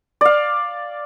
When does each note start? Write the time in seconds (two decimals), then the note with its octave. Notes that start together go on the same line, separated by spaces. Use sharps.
0.21 D5 F5